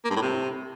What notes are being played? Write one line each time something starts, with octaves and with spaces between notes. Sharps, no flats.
A#3
G2
A2
C3